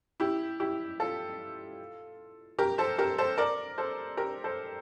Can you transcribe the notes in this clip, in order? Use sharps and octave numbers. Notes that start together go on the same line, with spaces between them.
E4 G4
E4 G4
F4 A4
G4 A#4
A4 C5
G4 A#4
A4 C5
A#4 D5
A4 C5
G4 A#4
A4 C5